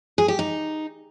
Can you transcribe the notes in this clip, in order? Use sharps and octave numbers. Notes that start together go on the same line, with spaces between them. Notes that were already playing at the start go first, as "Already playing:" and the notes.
G#4
G4
D#4